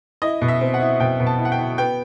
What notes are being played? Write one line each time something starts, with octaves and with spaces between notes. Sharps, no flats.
E4 D#5
B2
E5
C4
F#5
E4
B2 G5
B2
A5
E4
F#5
G5
E4
B3 G5